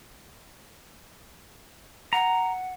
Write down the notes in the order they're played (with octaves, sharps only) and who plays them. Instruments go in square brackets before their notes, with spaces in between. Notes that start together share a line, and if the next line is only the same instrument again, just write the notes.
[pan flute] F#5 [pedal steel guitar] A#5